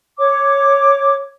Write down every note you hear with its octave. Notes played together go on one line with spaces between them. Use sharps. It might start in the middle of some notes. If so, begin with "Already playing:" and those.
C#5 D6